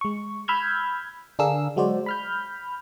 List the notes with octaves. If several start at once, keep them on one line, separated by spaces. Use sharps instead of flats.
G#3 C#6
B5 E6 F6 G6 G#6
D3 D4 G#4 A#4 F5 E6
F#3 G#3 F#4 C5 D5
B5 F6 G6